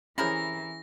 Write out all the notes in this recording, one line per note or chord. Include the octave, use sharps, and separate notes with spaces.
C3 E3 C#4 E4 G#4 A#4 A#6